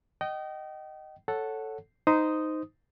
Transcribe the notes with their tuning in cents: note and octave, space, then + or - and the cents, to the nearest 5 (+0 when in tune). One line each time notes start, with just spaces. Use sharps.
D#5 -10 G5 -35
A4 +0 C#5 +0 F#5 +0
D#4 +0 C5 -20 D#6 +0